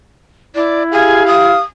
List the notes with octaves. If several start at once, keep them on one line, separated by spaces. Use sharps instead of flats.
E4 D5
G4 G#4 F5
D#6